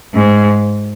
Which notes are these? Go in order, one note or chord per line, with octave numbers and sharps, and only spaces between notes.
G#2